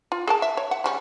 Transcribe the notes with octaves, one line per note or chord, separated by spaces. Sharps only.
F4
G#4 A#4 A5
E5
C#5
F#5
C#3 G3 C#4